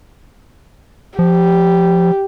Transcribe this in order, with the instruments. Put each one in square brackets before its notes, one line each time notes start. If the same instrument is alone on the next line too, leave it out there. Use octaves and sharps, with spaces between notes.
[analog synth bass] F3 [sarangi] G4